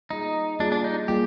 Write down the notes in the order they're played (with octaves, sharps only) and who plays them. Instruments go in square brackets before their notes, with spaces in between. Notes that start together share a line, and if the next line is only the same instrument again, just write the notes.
[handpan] G3 A#3 F4 G#4 [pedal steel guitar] D#4
[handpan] G3 A#3 F4 G#4 [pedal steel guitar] D4
[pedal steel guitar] D4
D#4
[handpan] G3 A#3 F4 G#4 [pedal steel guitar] G4